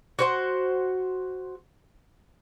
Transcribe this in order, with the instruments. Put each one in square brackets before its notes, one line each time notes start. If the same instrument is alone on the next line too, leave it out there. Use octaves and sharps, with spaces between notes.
[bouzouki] F#4 C5 F#5